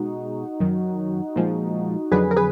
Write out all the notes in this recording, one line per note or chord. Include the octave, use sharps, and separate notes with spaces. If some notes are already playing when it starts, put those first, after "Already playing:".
Already playing: B2 G#3 D#4 F#4
F#2 D#3 F#3
A#2 F3 G#3
F2 D3 F#3 G#4 B4
A#4
G#4 B4